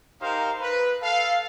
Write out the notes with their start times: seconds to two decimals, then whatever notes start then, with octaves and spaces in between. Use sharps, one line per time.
0.20 D#4 G4 A#4 C5 F5
0.61 B4
1.03 A4 F5